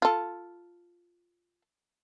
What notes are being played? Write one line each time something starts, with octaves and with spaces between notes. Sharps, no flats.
F4 A4